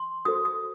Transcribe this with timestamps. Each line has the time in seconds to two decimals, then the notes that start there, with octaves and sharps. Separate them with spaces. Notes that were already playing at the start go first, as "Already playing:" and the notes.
Already playing: C6
0.25 F#4 A4 C5 D#6
0.45 D#6